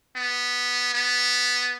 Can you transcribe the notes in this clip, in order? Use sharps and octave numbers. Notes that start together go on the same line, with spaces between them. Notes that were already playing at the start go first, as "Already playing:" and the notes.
B3
B3